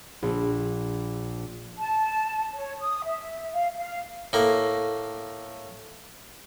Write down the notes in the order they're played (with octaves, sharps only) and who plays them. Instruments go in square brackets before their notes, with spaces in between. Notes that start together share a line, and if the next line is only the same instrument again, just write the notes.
[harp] A#1
[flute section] A5
C#5
D#6
E5
F5
F5
[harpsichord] A2 A#3